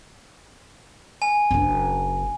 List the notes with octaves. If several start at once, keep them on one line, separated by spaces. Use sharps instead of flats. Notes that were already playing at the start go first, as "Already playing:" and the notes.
G#5
F#1 D4